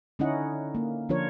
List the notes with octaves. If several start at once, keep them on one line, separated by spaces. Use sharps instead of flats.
D3 C#4 D#4 E4 D#5 F#5
A#3
D3 F3 D4 F4 A#4 C#5